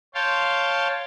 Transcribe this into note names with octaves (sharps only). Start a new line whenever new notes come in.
C#5 F5 G5 A5 C6